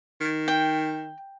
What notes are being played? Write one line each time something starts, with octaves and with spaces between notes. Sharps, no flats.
D#3
G5